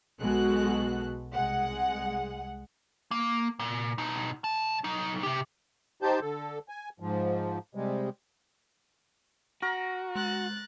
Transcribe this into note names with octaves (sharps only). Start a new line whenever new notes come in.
B1 B2 G#3 F#4 A4 F#6
C2 G#3 F#5
A#3
A#2
B2 D#4
B1 A5
F#3 D#4
C3 G4
D#4 G4 C5 A5 G6
D3 A4
G#5
G#2 F3
C3 G3 G#3
F#4 A#4 C#6
G#3 F#6 A6 F#7